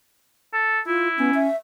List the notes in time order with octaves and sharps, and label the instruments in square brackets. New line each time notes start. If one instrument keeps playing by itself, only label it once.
[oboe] A4
[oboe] E4 [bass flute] F4
[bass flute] B3 [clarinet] C#4
[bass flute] E5